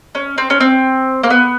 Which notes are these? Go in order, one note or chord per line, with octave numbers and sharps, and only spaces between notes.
C#4
C4
C#4
C4
A#3
B3